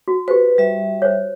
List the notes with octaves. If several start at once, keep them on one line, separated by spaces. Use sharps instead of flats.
F#4
G4 B4 C5
G3 E5
C5 C#5